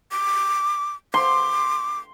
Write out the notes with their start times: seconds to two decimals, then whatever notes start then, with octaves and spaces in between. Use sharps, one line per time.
0.11 D6
1.14 C6 D6